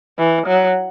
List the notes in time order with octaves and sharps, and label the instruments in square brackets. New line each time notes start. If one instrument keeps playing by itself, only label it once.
[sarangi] E3
F#3